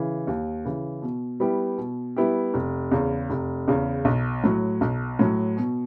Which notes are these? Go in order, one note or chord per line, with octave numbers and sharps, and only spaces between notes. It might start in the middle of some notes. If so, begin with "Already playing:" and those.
Already playing: C#3 E3
D#2
C#3 E3
B2
G3 B3 E4 G4
B2
G3 B3 E4 G4
F1
E2 C#3
F1
E2 C#3
B1
A2 F#3
B1
A2 F#3
B2